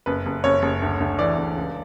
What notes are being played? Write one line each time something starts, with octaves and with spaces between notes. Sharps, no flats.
F#1 B4
F#1
F#1 C#5
F#1
D2
D2
E3 D5
D2
C#2